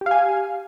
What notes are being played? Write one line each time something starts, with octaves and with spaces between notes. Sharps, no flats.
G4 F5 G#5